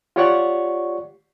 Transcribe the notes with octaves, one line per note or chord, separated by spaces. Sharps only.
F4 G4 C#5 D5 F#5 C#6